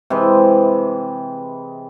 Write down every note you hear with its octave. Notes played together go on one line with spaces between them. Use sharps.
C3 E3 G#3 G#4